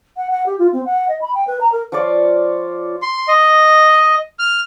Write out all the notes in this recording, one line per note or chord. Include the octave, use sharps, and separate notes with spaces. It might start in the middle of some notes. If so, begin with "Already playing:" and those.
F#5
F#5
G4
F4
C4
F#5
D#5
B5
G5
B4
A#5
A#4
F3 F4 C#5 D5
C6
D#5
F6